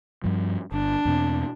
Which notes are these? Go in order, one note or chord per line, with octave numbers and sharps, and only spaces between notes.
G2 F3
G1 D4
E2 B2 C4